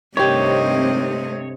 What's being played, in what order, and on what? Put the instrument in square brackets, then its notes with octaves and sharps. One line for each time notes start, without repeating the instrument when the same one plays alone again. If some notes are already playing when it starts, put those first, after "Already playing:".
[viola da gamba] G2 C3 D#5 [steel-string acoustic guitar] D#3 G4 [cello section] A3 C4 [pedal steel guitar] C#5